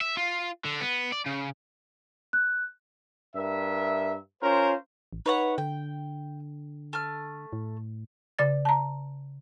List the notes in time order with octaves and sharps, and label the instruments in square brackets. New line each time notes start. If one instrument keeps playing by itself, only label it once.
[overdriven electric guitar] E5
F4
D3
B3
D5
C#3
[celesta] F#6
[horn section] G2 A#4 E5
C#4 F4 A#4 C5
[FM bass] A1
[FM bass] D#4 [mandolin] B4 C#5 F#5
[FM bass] D3 [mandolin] G5
[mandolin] A3 F6
[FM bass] A2
[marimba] C#3 D5 A6
A5 A#5